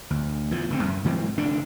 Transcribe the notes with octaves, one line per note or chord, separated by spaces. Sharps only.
D2
E2 A2 F3
F1 D3 C4
F#2
G#2 E3 F#3 C4
F1 D3 D4